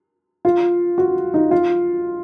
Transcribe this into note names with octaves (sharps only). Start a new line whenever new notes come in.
F4
F#4
D#4
F4